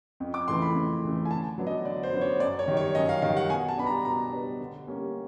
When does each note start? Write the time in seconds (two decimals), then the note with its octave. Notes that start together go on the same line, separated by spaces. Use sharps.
0.20 F2
0.34 D6
0.48 C#3 E3 A3 C6
0.62 B5
0.75 F2
1.04 C#3 E3 A3
1.25 G#5
1.30 D3 A5
1.58 F#3 B3 D4
1.67 D#5
1.85 D3 D5
2.03 C5
2.13 F#3 B3 D4
2.21 C#5
2.40 F#2 D5
2.59 C#5
2.68 D#3 G3
2.77 C#5
2.95 F#2 D#5
3.09 F5
3.22 D#3 G3 F5
3.37 F#5
3.50 B2 G#5
3.68 A5
3.77 G3 B3 D4 B5
3.87 A#5
4.05 B2 A#5
4.32 G3 B3 D4
4.60 D3
4.87 G3 A#3 C#4